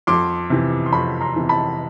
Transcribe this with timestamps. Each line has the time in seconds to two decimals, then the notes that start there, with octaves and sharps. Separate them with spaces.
0.07 F2 C6 D6
0.50 C3 E3
0.86 C6
0.92 F2 B5 C#6
1.21 A#5 C6
1.36 C3 E3
1.49 A5 B5